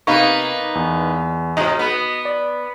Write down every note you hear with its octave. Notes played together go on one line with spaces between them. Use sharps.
C3 A#3 B3 D#4 F5 C#6
E2
G#2 C3 F#4 D#5
B3
D5